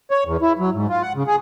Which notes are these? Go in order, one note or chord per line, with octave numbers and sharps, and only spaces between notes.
C#5
E2
E4
F#3
G#2
F4
F#5
C#3
G#4